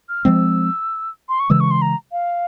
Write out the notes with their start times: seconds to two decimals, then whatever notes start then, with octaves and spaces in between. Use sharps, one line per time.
0.09 F6
0.25 F3 G#3 C4 E6
1.29 C6
1.40 C#6
1.50 C#3 E3 G#3 E6
1.60 C#6
1.71 C6
1.82 A#5
2.12 F5